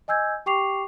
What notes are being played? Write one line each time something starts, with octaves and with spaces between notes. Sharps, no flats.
D#5 G#5 E6 G6 G#6
G4 G5 C#6 D6 C7 F7